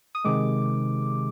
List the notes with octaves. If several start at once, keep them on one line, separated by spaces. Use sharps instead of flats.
D#6
C3 D#3 G#3 D6